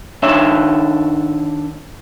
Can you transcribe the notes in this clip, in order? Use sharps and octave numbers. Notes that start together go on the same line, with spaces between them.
D#3 D4 C#5 E5